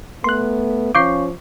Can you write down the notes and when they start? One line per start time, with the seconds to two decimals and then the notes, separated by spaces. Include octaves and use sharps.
0.24 A3 B3 C6 F#6
0.95 F3 C#4 F5 C#6 D6 G6 C7